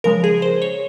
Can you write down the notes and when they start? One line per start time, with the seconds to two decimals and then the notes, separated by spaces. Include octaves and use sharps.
0.04 C#3 F3 G#3 A#4
0.24 G#4
0.42 C5
0.62 C#5